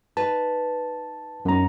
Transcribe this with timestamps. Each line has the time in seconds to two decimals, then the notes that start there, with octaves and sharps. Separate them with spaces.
0.17 D#4 B4 A5
1.45 F#2 B3 D#4 A#5